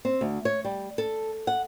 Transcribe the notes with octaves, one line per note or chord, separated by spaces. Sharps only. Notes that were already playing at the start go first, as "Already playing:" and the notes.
C4
D2
C#5
G3
A4
F#5